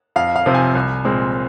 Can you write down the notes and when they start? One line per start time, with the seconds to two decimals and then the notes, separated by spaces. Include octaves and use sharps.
0.16 F2 F5
0.36 F5
0.46 C3 F3 C4
0.55 G#5
0.75 C2
1.05 A#2 G#3 C4